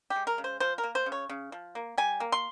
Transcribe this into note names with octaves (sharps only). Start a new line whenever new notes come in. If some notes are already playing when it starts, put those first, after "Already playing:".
G4
G#3
A#4
C#3
C5
F3 C5
A#4
A#3
C5
C#3
C#5
C#3
F3
A#3
G3 G#5
A#3
C6